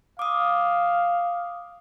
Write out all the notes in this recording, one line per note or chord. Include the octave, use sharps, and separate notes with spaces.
F5 D6 D#6